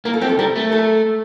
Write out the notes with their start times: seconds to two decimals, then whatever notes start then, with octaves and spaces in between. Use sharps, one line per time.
0.05 A#3 A#4
0.14 A4
0.21 C4 G4
0.29 A4
0.39 G3 A#4
0.55 A3
0.72 A4